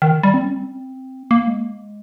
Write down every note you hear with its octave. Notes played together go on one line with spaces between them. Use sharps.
D#3
G3
C4
C#4
C4
A#3
G#3